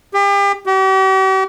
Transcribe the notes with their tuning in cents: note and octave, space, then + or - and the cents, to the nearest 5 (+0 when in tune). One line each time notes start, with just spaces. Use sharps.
G4 +35
G4 -45